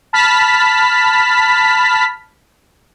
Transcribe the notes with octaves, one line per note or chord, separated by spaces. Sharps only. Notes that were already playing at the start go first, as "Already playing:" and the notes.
A5 B5 F6 B6